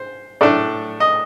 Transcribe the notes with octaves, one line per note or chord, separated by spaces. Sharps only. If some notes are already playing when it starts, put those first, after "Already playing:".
Already playing: C5
A2 A3 D4 D5
D#5